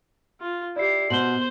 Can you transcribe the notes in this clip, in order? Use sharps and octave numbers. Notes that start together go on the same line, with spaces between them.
F4
E4 G4 D5 C7
B2 C5 F#7 G7